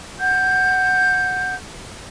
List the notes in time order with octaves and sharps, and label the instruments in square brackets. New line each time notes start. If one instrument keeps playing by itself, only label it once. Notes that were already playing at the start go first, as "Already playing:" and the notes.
[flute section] F#5 G6